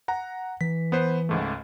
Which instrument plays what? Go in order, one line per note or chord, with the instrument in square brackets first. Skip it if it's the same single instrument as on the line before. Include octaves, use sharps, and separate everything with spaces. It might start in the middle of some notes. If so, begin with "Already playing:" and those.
[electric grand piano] F#5 A#5
[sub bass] E3 [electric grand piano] B6
[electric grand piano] B3 B4 C5
C#2 G#2 A3